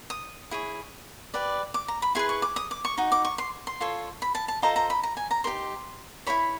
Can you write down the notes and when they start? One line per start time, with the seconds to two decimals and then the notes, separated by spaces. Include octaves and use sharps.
0.10 D#6
0.51 E4 G#4 C#5
1.34 G4 B4 D5
1.74 D6
1.88 A#5
2.02 B5
2.15 E4 G#4 B4 C6
2.29 C#6
2.42 D6
2.56 D#6
2.71 D6
2.85 C#6
2.98 D#4 F#4
3.12 D6
3.25 C#6
3.38 C6
3.67 C6
3.80 F4 A4 C#5
4.22 B5
4.35 A5
4.48 A5
4.62 F4 A4 C5 D#5 A#5
4.76 A#5
4.90 B5
5.03 A#5
5.17 G#5
5.31 A#5
5.44 D#4 G4 A#4 C6
6.26 E4 G#4 C#5 B5